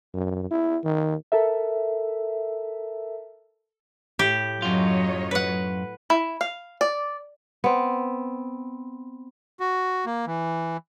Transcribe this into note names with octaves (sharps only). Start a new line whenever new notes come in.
F#2
E4
D#3
A4 A#4 E5
A2 G4
F#2 F#3 F4 C#5 D#5
B4 F#5
E4
F5
D5
B3 C4
F#4
A#3
E3